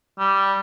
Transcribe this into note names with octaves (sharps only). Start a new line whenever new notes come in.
G3